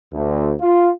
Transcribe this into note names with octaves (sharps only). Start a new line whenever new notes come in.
D2
F4